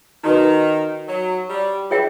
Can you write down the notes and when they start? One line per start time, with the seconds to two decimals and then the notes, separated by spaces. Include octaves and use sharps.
0.24 D#3 D#4 F#4 B4
1.08 F#3
1.50 G3
1.90 E3 F4 G#4 C#5 E5 G5